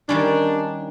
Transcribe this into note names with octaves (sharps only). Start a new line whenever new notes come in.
D#3 G3 C#4 D4